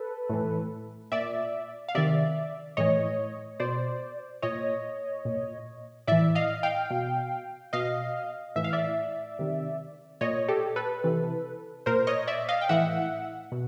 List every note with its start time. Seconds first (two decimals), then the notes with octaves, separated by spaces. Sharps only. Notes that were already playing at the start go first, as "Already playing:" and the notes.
Already playing: A4 B4
0.29 A2 E3
1.12 A#2 D5 E5
1.88 F5
1.95 C3 D#3 D5 E5
2.77 A2 E3 C#5 D#5
3.60 B2 C5 D5
4.42 A#2 C#5 D#5
5.25 A#2
6.07 A2 E3 D5 E5
6.35 D#5 F5
6.63 F5 G5
6.90 B2
7.73 B2 D#5 F5
8.56 A2 E3 E5
8.64 F5
8.73 D5 E5
9.39 C3 D#3
10.21 A#2 C#5 D#5
10.48 G4 A4
10.76 A4 B4
11.04 C3 E3
11.86 A#2 A#4 C5
12.07 C#5 D#5
12.27 D5 E5
12.49 D#5 F5
12.61 G5
12.69 A2 E3 E5 F#5
13.52 B2